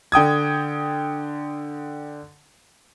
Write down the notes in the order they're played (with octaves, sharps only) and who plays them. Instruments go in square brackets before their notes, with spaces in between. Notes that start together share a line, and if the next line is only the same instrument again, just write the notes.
[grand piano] D3 G5 D#6 G#6